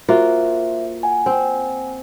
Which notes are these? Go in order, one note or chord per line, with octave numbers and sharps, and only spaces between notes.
A#3 F4 F#4 C5 E5
F#5 G#5
C4